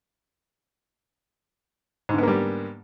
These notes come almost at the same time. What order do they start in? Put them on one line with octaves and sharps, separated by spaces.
G#2 D3 B3 A#3 G3